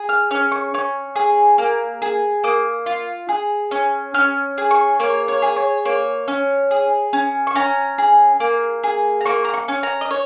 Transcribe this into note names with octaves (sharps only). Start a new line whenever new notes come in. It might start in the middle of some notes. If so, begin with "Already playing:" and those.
Already playing: G#4
F6
C#4 F6
C#6
C#4 C#6
G#4
A#3
G#4
A#3 D#6
F4
G#4
C#4
C#4 F6
G#4
C#6
A#3 C#5
C#5
G#4
C#5
A#3 C#5
C#4
G#4
C#4
C#6
C#4 A#5
G#4
A#3
G#4
A#5
A#3 C#6
A#5
C#6
C#4
A#5
D#5
C#5